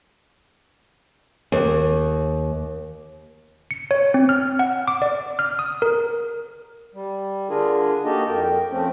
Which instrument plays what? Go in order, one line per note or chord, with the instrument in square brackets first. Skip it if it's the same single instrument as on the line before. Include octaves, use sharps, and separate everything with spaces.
[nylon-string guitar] D#2
[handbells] C#7
C#5
C4
F6
F#5
D6
D5
F6
D#6
A#4
[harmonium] G3
D3 D4 F4 G#4 A#4
A#3 D#4 F#4 G4 A4 D#5
F2 A#4 G5
F3 A3 C4 C#4